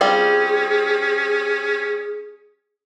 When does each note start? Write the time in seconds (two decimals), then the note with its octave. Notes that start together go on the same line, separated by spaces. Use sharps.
0.01 G3 C4 C#4 F4 G#4